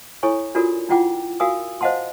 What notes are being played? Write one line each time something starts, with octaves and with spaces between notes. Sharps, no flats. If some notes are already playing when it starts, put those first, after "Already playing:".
E4 A4 C#5 G#5 C#6
D4 F4 F#4 A4 A#4 D5
D4 E4 F4 F#5 G5 D6
F#4 A#4 F5 G#5 D#6 E6
C5 D#5 F5 F#5 A5 C6